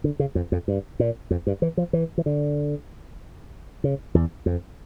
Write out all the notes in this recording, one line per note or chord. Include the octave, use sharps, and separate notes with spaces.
D3
C#3
F2
F2
G2
A#2
F2
G2
E3
F3
E3
E3
D3
C#3
E2
F2